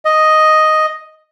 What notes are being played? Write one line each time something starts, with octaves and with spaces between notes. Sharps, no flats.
D#5